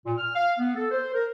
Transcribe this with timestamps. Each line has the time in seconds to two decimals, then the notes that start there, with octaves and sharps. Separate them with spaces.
0.06 A#2
0.18 F6
0.35 F5
0.59 B3
0.76 A4
0.91 C5
1.14 A#4